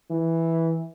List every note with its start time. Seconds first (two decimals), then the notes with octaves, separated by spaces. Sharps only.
0.10 E3